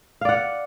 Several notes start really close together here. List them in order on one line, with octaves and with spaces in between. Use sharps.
F5 D5 F#5